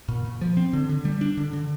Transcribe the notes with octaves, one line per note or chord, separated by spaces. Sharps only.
A#2
A#2
F3
C4
D3
D3
G3
D4
D3
D3